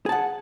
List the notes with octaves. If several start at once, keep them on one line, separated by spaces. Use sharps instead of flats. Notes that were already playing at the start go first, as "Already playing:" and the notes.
G#4 F#5 A5